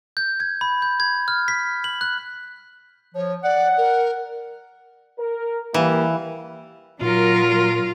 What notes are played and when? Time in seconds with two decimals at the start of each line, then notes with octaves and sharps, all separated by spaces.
0.17 G6
0.40 G#6
0.61 B5
0.82 G6
1.00 G#6
1.28 F6
1.48 B6
1.84 F#7
2.01 F#6
3.15 F3 C#5
3.43 D5 F#5
3.78 A#4
5.19 A#4
5.74 E3 G3 A#3
7.01 A#2 F#3 F4 A#4